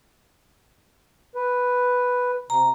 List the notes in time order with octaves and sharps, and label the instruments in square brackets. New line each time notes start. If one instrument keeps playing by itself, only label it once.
[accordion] B4
[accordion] C3 [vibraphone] A#5